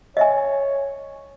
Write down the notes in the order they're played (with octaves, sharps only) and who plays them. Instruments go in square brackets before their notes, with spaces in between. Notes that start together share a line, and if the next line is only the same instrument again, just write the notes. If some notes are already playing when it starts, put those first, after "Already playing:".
[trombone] C#5 [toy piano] D#5 E5 G#5